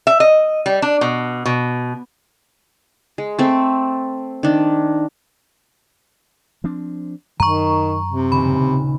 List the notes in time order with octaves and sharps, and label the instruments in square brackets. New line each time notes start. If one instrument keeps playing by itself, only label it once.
[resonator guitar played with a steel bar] E5
D#5
G3
D4
B2
B2
[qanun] G#3
A3 C4
D#3 D4
[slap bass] F3 C4 D4
[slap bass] F#2 [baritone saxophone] D#3 [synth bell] A#5 C#6
[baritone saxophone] C3
[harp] D#1 C#3 [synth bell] B5